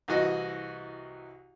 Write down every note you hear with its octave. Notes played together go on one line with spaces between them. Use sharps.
C2 E3 F#4 D#5